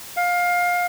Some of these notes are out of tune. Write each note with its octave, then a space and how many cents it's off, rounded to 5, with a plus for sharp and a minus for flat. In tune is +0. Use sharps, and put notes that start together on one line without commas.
F5 +20